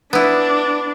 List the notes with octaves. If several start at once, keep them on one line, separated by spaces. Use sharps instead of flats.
B3 D4 E4